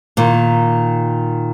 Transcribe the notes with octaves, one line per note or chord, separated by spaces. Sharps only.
A#2 D#3